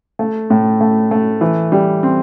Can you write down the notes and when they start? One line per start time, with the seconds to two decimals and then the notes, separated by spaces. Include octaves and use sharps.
0.19 A3
0.50 A2
0.81 A3
1.11 A3
1.41 E3
1.72 G3
2.03 C4